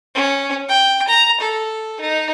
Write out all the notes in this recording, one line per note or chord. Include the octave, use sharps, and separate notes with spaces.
C#4
G5
A#5
A4
D#4